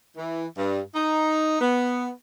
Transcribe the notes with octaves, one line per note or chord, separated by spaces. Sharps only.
E3
G2
D#4
B3